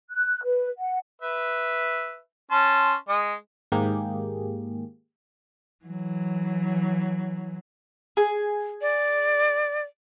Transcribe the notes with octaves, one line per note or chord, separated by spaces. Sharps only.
F#6
B4
F#5
B4 E5
C#4 A5 C6
G#3 D#5
G#2 D#3 A#3 G4 G#4
E3 F#3
G#4
D5